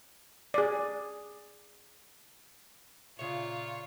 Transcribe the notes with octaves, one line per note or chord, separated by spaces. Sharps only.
G#4 D5
A#2 C#3 F4 C#5 E5